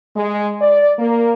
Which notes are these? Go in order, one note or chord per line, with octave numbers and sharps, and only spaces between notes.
G#3
D5
A#3